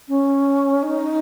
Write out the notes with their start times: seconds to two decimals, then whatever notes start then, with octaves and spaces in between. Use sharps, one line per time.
0.08 C#4
0.83 D#4